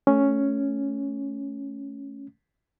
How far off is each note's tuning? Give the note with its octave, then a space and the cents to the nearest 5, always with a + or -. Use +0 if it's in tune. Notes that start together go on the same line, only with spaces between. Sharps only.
A3 +0 C#4 +0